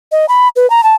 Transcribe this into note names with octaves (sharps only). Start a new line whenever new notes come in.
D#5
B5
B4
A#5
A5